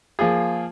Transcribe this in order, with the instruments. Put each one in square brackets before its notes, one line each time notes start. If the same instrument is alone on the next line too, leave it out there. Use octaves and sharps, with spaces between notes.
[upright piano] F3 A#3 F4 G#4